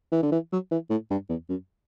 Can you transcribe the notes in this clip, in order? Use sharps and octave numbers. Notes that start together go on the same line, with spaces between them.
E3
D3
E3
F#3
E3
A2
G2
E2
F#2